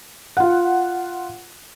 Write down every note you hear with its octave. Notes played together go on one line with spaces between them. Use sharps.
F4 F#5